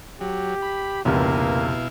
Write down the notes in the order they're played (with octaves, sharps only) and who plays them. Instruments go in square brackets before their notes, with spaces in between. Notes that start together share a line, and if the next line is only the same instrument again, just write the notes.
[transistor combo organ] F#3 [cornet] G4
[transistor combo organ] B5
[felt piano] F1 C#2 [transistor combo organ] B2 E4 F5 [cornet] A#3